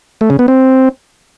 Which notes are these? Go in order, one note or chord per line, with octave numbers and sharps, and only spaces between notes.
A3
C#3
B3
C4